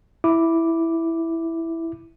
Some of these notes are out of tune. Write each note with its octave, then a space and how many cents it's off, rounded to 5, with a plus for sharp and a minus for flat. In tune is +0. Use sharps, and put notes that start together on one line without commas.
E4 +0 D6 +0